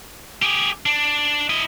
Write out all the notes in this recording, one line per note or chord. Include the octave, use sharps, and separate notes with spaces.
G4 G#4
D4
E4 D#5